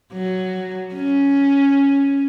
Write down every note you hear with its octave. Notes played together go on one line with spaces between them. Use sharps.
F#3
C#4